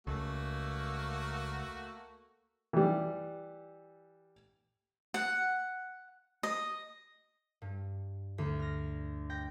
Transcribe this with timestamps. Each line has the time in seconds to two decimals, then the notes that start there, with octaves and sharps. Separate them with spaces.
0.07 C#2 A3 A#3 F#4
2.73 E3 G3
5.14 F#5
6.43 D#5
7.62 G2
8.38 D2
8.59 F6 A#6
9.30 G5 G6 A#6